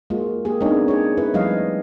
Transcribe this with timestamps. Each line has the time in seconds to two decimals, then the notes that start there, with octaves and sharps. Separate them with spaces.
0.10 G#3 A#3 F4 F#4
0.45 A#3 G4 G#4
0.61 G#3 B3 C4 D4 D#4 C#5
0.88 G#4 C#5
1.17 C#4 E4 B4
1.34 F3 G3 A3 C#5 D#5 F5